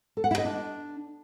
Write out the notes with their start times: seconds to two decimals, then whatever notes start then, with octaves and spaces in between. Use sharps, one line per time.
0.17 A4
0.24 F#5
0.31 E4
0.38 D#5
0.45 D4